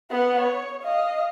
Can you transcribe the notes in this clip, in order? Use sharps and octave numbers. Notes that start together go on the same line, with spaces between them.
B3 F#5
C#5
D#5 F5